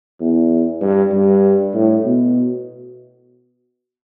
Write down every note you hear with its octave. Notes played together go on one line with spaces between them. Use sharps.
E2
G2
G2
A2
B2